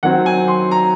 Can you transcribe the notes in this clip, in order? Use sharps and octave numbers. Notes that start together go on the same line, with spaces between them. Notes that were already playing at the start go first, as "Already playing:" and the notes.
D#3 F#3 C4 F#5
G#5
C6
A#5